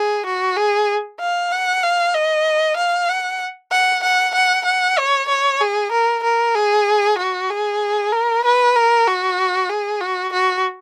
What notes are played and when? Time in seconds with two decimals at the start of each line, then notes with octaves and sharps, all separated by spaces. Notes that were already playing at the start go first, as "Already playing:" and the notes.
Already playing: G#4
0.26 F#4
0.56 G#4
1.20 F5
1.52 F#5
1.83 F5
2.14 D#5
2.77 F5
3.09 F#5
3.71 F#5
4.03 F#5
4.35 F#5
4.65 F#5
4.98 C#5
5.29 C#5
5.61 G#4
5.92 A#4
6.24 A#4
6.55 G#4
7.18 F#4
7.50 G#4
8.12 A#4
8.44 B4
8.76 A#4
9.07 F#4
9.69 G#4
10.01 F#4
10.33 F#4